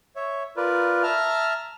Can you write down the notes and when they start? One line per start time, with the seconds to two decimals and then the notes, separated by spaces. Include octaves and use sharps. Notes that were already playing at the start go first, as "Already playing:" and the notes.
0.16 C#5 E5
0.57 F4 A#4 B4 D5
1.03 E5 A5 A#5 F6